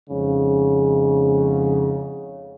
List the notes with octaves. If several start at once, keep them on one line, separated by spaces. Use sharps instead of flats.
F2 G#2 C#3